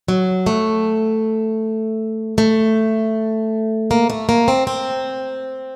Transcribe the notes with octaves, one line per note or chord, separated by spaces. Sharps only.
F#3
A3
A3
A#3
A3
A#3
C4
C4